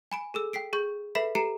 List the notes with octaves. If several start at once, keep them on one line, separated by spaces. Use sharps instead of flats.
G#5 B5 D7
G#4 A4 E6
G5 B6 C7 D7
G#4 C#6 G6
A4 B4 E5 B5 B6 C7
G4 A4 A#5 C7 C#7 E7